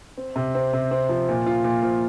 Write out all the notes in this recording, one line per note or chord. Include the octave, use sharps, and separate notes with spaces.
C4
C3
C4
C3
C4
F3
A#2
F4
A#2
F3